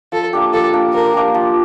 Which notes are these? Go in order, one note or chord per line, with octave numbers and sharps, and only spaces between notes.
F3 A4
A#3 D4 G4
F3 A4
A#3 D4 G4
F3 A#4
A#3 D4 G4
F3